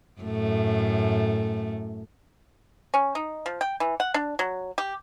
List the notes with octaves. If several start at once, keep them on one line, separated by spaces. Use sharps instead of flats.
F#2 A2 A3
C#4
D#4
F3
G5
E3
F#5
D4
F#3
G4